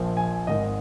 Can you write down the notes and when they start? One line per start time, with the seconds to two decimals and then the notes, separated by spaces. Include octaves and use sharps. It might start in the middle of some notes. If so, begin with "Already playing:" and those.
Already playing: A#1 A#2 F3
0.17 G#5
0.47 G#1 G#2 D#3 D#5